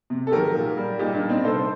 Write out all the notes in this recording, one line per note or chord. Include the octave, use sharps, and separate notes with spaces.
C3
A4
D#3 F#3 G4 A#4
A#2
G3
A#2 D#4 G4
D4
G3
C4 D#4
C3 A4 C5